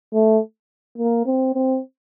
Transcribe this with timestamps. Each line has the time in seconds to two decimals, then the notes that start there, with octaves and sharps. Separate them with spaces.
0.13 A3
0.98 A#3
1.26 C4
1.54 C4